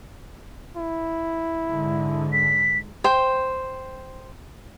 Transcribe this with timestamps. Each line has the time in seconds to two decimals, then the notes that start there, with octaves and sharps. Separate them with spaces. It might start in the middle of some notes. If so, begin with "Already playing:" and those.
0.77 E4
1.68 G#2 D3 G#3
2.33 B6
3.04 C5 G5